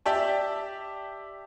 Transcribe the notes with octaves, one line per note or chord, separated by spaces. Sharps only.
G4 D5 E5 G5 A5